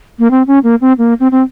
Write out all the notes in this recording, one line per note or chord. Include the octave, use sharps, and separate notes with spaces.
A#3
C4
C#4
A#3
C4
A#3
C4
C4